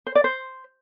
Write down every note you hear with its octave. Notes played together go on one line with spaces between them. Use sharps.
C5
D5
C5